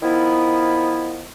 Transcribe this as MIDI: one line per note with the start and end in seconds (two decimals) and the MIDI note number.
0.03 1.26 51
0.03 1.26 53
0.03 1.26 59
0.03 1.26 64